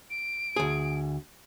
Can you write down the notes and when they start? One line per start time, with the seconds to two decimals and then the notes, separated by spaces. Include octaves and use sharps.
0.10 D7
0.56 D2 G#4